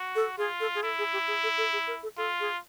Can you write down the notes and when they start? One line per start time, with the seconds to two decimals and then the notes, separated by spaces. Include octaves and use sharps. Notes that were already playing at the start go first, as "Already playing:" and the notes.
Already playing: F#4
0.15 A4
0.38 F4 G#4
0.60 A4
0.75 G#4
0.83 E4 A4
0.98 G#4
1.13 G4
1.27 G#4
1.43 A4
1.57 A4
1.73 G#4
1.87 A#4
2.03 A4
2.17 F4 A4
2.40 G#4